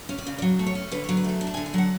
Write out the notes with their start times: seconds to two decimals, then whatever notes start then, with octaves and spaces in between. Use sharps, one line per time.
0.09 C#4
0.18 D5
0.27 C#3
0.38 D5
0.42 F#3 C#5
0.59 A3
0.66 C#5
0.75 C#4
0.92 D3 B4
1.04 F#3 C#5
1.17 B4
1.24 A3 A4
1.41 D4
1.47 A5
1.54 D3 G#5
1.66 G#5
1.74 F#3 F#5